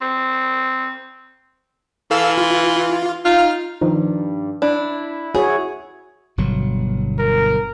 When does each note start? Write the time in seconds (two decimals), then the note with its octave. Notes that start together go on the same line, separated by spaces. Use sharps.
0.02 C4
2.11 E3 A4 F5 E6
2.38 F4
3.25 D#4 F4 F6
3.81 G2 D#3 F3 D#4
4.62 D4 E4
5.35 F#4 G#4 C#5
6.38 G1 B2 F#3
7.19 A#4